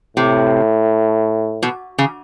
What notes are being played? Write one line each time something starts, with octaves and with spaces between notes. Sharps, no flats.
A2 C3
B2
C#3